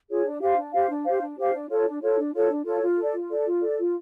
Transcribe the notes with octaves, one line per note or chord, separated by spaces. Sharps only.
F4 G#4 C#5
D4
G4 C5 F5
D4
G4 C5 F5
D4
G4 C5 F5
D4
G4 C5 F5
D4
F4 A4 C#5
D4
F4 A4 C#5
D4
F4 A4 C#5
D4
F4 A4 C#5
F4
A4 D5
F4
A4 D5
F4
A4 D5
F4